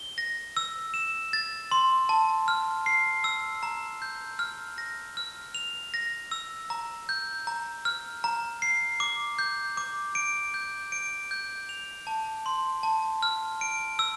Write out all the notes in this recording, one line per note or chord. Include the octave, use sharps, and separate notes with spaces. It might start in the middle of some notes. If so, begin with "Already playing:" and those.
Already playing: G7
A#6
E6
E7
A6
C6
A5
F6
C7
E6
A#5
G6
F6
A#6
F6
F7
A#6
E6
A#5
G6
A#5
F6
A#5
C7
D6
G6
D6
D7
G6
D7
G6
F7
A5
C6
A5
F6
D7
E6